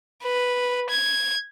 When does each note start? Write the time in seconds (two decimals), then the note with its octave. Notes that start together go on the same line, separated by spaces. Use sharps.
0.23 B4
0.90 G#6